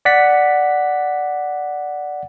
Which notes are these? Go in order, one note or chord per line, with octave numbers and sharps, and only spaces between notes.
D5 F#5 B6